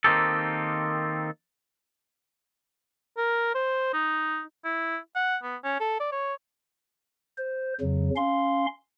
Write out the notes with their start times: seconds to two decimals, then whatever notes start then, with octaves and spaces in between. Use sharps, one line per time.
0.04 D#3 A#3 C4 D#4 G4 A4
3.17 A#4
3.55 C5
3.93 D#4
4.64 E4
5.15 F#5
5.43 B3
5.64 C#4
5.80 A4
6.00 D5
6.12 C#5
7.38 C5
7.81 F2 C#3 F#3
8.16 C#4 F5 C6